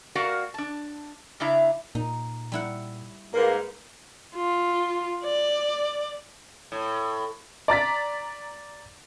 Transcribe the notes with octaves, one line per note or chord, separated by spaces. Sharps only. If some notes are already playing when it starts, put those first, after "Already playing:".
A#3 F#4 A#4 D5 F5 F#5
D4 A5
C#3 D4 E4 E5 A#5
A#2 D#4
G3 E4 F#5
G#2 A#3 A#4 B4
F4
D5
A2
D5 A#5 A6 B6